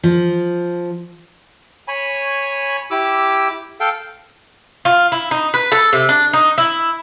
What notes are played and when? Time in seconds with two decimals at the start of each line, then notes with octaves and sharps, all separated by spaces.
0.03 F3
1.88 C#5 G#5 B5
2.91 E4 G4 D6 E6
3.80 A4 F5 G5
4.85 F4
5.12 E4
5.31 D#4
5.54 B4
5.72 A4
5.93 C3
6.09 D4
6.33 D#4
6.58 E4